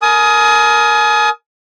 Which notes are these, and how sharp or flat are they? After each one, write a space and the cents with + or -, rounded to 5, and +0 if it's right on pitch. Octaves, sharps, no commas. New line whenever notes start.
A#4 +0 G#5 +35 D#6 +15